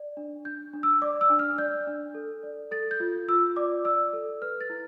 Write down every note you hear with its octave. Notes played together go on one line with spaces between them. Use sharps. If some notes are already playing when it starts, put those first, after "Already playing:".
Already playing: D5
D4
D4 G6
D4
E6
D5 D6
E6
D4
F6
D5 G6
D4
A4
D5
A4 A6
G6
F4
F4 E6
D5 D6
D5 E6
A4
B4 F6
A6
E4